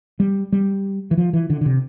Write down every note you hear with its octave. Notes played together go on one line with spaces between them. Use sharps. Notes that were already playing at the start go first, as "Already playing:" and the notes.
G3
G3
E3
F3
E3
D3
D3
C3